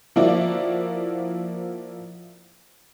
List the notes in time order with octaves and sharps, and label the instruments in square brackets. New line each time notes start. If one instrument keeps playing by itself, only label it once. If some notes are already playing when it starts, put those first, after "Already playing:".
[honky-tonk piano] F3 A#3 E4 F#4 D5